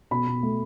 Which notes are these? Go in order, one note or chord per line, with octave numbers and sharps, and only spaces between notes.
B2 B5
B2
A3